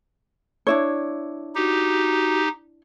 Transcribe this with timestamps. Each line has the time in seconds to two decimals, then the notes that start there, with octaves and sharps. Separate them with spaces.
0.67 D4 E4 C#5
1.55 D#4 F#4 G4